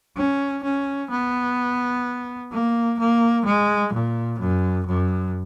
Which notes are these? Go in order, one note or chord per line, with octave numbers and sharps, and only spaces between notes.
C#4
C#4
B3
A#3
A#3
G#3
A#2
F#2
F#2